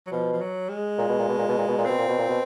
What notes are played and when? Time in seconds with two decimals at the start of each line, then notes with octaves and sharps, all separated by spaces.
0.07 F#3
0.12 B2 F3
0.33 F3
0.41 F#3
0.69 G#3
0.98 A#2
1.09 B2
1.19 A#2
1.29 B2
1.39 A#2
1.49 B2
1.58 A#2
1.68 B2
1.78 A#2
1.85 B2 C4
1.99 A#2
2.08 B2
2.18 A#2
2.29 B2